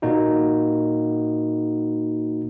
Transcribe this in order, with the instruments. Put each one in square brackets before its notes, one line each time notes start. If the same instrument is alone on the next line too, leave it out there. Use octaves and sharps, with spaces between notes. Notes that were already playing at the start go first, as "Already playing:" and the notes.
[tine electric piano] A#2 A#3 D#4 F#4